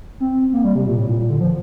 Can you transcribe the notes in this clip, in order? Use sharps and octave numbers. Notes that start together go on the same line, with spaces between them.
C4
A#3
G3
C3
A#2
A2
A#2
A#2
D3
F3